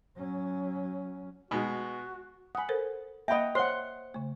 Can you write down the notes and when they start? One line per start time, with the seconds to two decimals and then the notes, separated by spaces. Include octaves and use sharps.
0.17 F#3 C#4
1.51 B2 G#3 F#4
2.55 F#5 G#5 B5 D#6
2.69 A4 A#4 C5
3.28 A#3 D#5 E5 F#5 G5 B5
3.55 C5 C#5 F#5 C6
4.14 C#3 A3